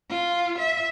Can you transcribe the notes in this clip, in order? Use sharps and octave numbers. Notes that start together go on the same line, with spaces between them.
F4
E5